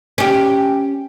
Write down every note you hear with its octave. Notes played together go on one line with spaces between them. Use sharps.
C#4 G4